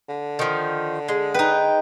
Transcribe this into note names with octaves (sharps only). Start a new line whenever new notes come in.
D3
D#3 F3
G#3
D#4 B4 G5